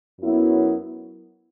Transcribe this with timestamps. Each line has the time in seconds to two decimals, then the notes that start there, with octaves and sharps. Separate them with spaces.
0.21 F#2 F#3 B3 E4